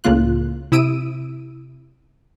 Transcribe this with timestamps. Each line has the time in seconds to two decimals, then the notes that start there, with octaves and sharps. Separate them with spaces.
0.04 C#2 A2 C#3 A#3 F4 F#6
0.72 C3 E4 D#6 E6 D7 D#7